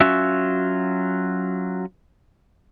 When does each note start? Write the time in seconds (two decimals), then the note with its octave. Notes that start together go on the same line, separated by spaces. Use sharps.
0.01 F#3 C#4 F4 F#4 E5